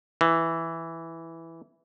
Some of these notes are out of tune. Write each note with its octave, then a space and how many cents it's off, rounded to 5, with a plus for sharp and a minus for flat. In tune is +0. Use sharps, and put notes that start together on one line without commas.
E3 +0